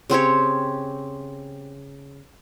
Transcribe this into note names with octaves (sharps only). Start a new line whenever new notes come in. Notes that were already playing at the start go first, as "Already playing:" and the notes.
C#3 C4 G4 C#5